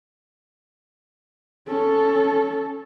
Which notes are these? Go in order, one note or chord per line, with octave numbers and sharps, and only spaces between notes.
C#4 A4